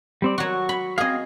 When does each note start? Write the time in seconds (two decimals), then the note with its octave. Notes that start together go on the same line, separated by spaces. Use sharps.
0.22 G3 C4 D5
0.38 F#3 F#4 C#6
0.69 B5
0.98 C4 G#4 D#5 F5